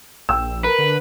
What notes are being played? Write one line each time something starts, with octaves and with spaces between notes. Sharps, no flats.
A#1 G5 E6
A#4 B4
D3